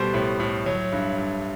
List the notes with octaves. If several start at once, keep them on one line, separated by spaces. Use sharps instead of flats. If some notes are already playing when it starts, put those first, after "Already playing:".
Already playing: B2 G3 A3 C5
A2
A2
F#3
G2
G2